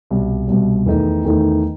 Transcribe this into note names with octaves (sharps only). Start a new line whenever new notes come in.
C2 B2 G3
C2 B2 G3
E2 D#3 A3 D#4
E2 D#3 A3 D#4